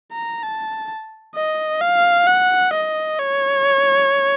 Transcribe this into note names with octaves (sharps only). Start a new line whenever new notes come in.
A#5
A5
D#5
F5
F#5
D#5
C#5